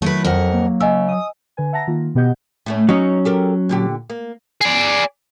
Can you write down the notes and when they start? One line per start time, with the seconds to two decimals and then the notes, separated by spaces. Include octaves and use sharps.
0.02 D#3 F#3 A3 E4 B4
0.24 F2 A#4 F#5
0.53 A#3
0.80 C#3 D#5 G#5 E6
1.09 D#6
1.57 D3 B4 G#5
1.73 E5 F#5 A5 A#5 A#6
1.87 D#3 A#3 F4
2.15 B2 B3 G4 D#5 F#5 G6
2.66 A2 A3 C#4
2.89 F#3 C#4 D#4
3.25 G4 A4 A#4
3.69 A#2 D3 G4
4.10 A#3
4.61 G#4 D5